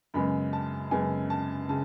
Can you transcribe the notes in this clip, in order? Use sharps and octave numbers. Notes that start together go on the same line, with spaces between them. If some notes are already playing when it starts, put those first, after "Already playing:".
F#2 C#3 G#3 B3 B5
A5
F#2 C#3 G#3 B3 G#5
A5
C#3 A5